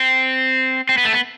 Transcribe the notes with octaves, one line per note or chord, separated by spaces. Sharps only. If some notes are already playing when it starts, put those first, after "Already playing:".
Already playing: C4
C4
B3
A3
B3